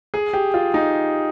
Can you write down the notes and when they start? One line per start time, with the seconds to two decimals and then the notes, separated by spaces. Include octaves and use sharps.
0.14 G#4
0.33 G4
0.54 F4
0.74 D#4